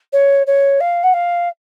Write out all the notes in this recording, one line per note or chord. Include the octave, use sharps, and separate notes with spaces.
C#5
C#5
F5
F#5
F5